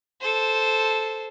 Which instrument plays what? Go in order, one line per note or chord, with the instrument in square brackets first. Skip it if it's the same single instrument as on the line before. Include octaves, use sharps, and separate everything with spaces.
[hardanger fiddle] A4 C5